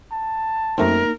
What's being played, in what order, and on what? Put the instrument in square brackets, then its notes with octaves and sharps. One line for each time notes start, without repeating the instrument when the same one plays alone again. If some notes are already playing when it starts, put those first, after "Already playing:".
[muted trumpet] A5
[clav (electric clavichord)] F#2 A3 C4 [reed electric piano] A#3 D#4 [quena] A#4